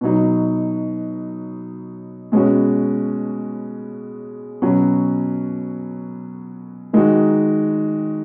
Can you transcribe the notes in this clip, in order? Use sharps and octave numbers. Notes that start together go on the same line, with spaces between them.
B2 F#3 D#4
B2 G#3 C#4 F#4
B2 F#3 C#4 F#4
D#3 G#3 D#4 F#4